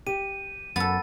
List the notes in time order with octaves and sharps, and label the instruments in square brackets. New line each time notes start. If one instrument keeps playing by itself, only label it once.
[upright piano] G4 [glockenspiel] D#7
[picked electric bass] F#2 [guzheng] B3 A4 [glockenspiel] A6